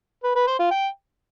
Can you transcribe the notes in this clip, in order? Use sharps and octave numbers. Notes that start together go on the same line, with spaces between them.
B4
B4
C5
F4
G5